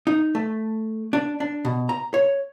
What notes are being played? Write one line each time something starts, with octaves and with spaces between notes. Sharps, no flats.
D#4
A3
D4
D4
B2
A#5
C#5